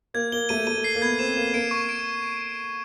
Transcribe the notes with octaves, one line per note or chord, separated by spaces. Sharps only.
A#3 G#6
A#3 G7
A3 D#7
A3 D#7
C7
A#3
B3 G#6
C4 E7
A#3 E7
A#3 D7
C#6
D7